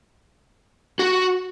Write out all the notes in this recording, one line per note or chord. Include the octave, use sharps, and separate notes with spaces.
F#4